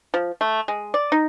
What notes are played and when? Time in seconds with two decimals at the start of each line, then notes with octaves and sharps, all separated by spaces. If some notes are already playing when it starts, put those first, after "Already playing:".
0.14 F3
0.41 A3
0.68 G#3
0.94 D5
1.12 D#4